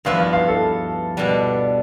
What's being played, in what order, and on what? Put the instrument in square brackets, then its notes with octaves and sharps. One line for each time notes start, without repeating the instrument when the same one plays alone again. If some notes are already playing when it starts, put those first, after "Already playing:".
[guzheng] G2 F3 B3 E4 B4 [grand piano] F5
[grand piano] F5
F5
A4
[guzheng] B2 G3 D4